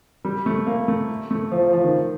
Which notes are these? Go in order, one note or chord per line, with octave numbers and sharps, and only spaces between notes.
G3
A3
A#3
A3
A3
F3
F3
F3
D#3